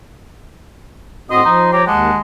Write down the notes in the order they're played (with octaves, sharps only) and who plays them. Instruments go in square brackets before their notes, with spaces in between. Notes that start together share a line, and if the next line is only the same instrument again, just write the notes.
[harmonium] A2 C4 F#4 [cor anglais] D#5 [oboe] C6 [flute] D#6
[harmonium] F3 [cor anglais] D#4
[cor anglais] G4 [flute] C#5 [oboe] A#5
[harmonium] D#2 [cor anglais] G#3 [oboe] F#5 [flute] A5